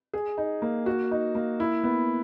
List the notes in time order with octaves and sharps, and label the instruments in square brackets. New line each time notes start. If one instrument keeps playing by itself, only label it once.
[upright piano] G#4
D#4
A#3
F#4
D#4
A#3
E4
B3